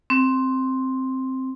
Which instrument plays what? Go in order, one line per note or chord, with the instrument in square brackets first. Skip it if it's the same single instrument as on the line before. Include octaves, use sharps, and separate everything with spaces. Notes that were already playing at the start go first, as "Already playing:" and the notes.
[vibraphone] C4